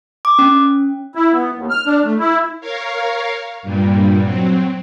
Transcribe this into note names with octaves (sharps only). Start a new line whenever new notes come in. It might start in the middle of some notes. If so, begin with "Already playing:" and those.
D6
C#4
E4
B3
D#2
F6
D4
A3
E4
A#4 C#5 F5
G2 A#2 G3
F#3 C4